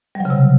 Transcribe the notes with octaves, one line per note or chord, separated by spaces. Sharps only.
G3
F#3
C#3
C3